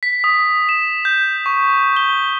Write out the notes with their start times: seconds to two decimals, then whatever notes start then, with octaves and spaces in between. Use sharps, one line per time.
0.03 B6
0.24 D#6
0.69 E7
1.05 G6
1.46 C#6
1.96 G7